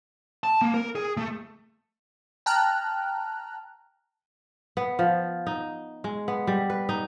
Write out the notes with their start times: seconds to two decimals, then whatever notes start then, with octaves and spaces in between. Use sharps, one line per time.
0.44 A5
0.62 A#3
0.74 A#4
0.95 G#4
1.17 A3
2.46 G5 A5 A#5 F6 F#6
4.77 B3
4.99 F3
5.47 D#4
6.04 G#3
6.28 B3
6.47 G3
6.70 B4
6.89 D#4